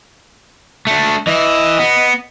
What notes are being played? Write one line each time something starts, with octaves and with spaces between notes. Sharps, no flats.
A3 D4
E3 E4 D#5
B3